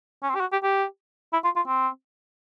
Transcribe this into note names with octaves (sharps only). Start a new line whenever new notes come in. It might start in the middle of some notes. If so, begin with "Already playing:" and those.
C#4
C4
G4
F#4
G4
G4
E4
F4
F4
C4